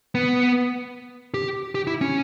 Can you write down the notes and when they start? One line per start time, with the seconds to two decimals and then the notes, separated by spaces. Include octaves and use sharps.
0.15 B3
1.34 G4
1.75 G4
1.87 E4
2.01 C#4